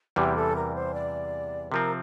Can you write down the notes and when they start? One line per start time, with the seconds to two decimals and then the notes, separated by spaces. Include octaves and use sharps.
0.16 E2 C3 E3 G3 G4
0.36 A4
0.56 A#4
0.75 C5
0.94 D5
1.72 C3 F3 C4 A#4